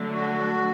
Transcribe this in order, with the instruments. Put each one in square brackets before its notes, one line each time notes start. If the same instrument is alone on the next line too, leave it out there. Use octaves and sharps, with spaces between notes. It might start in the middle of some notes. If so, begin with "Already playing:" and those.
Already playing: [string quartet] D3 F#3 A3 D4
[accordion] F#4